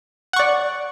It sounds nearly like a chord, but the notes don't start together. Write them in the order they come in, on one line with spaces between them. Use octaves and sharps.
F#5 C#6 D5